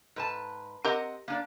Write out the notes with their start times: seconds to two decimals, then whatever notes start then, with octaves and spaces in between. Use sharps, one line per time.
0.16 G#2 B4 A5
0.84 C4 G4 A#4 D#5 F#5
1.28 A#3 D4 D5